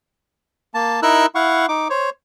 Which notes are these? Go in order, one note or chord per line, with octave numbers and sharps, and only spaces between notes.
A#3 A5
D#4 E4 A#4 E6 F#6
E4 F5 F#5 C#6
D#4 D6
C5 C#5